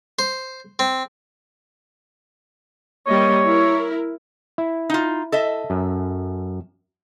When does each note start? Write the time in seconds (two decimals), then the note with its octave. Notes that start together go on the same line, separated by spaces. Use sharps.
0.19 C5
0.79 C4
3.07 G3 A#3 C#5 D#5
3.45 E4 A#4
4.58 E4
4.90 D#4 F4
5.32 A4 D#5 E5
5.70 F#2